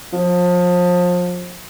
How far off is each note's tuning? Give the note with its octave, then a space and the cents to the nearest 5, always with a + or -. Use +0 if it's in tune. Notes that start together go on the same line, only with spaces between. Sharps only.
F3 +30